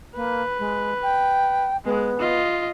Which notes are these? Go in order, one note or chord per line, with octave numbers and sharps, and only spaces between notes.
A#3 B4
G#3
G5
G#3 B3
F4 D#5